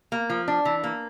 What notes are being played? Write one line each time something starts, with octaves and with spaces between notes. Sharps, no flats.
A#3
F3
D4
E3
A#3